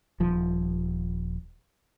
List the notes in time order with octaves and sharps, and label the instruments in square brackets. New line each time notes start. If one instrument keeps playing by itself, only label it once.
[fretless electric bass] D#1 F3